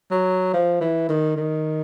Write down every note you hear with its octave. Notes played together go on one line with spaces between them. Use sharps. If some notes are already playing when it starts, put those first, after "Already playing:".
F#3
F3
E3
D#3
D#3